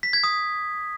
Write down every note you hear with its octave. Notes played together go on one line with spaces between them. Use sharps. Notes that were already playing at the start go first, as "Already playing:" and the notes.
B6
G#6
D#6